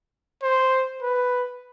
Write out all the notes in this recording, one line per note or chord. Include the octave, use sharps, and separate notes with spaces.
C5
B4